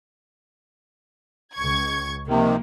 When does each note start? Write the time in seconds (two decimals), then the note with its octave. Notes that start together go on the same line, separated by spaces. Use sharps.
1.55 C#2 C#6 G#6
2.28 C3 D#3 F3 A#3